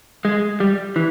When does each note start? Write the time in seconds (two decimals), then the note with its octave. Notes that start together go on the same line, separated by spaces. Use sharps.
0.25 G#3
0.60 G3
0.96 E3